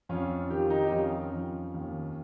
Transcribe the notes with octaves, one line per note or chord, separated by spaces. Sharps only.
F2 C#4 F4
D#3 G4
F4
D#4 G4
G4
F2 C#4 F4
F2
D#2